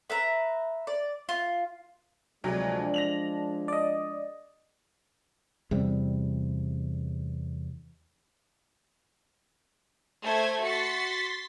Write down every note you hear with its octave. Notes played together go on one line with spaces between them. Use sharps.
B4 E5 A#5
D5
F4
D2 C3 F3 F#3 G#3 D4
A#6 F7 F#7
D5 D#5
E2 C3 G3
A3 C5 G#6
F#4 C6 A6 B6 C#7